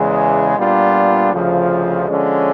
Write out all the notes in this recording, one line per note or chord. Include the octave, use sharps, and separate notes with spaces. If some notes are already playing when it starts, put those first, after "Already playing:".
Already playing: E2 C#3 E3 G#3
A#2 G3 B3 D4 F4
D2 C#3 F3
D3 F3 G#3 C#4